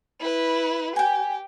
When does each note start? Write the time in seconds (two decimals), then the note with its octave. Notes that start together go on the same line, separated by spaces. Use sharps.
0.20 E4 B4
0.96 G4 G5 G#5